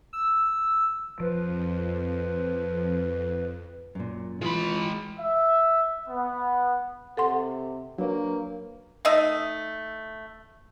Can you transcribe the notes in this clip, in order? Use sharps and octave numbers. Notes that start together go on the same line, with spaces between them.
E6
F2 F3 B4
F#2 A#2
E3 G#3 F4 B5 C6
E5
B3
C3 A4 F#5 C6
F#3 A#3 D4 B4 C#5
A3 D#4 D#5 E5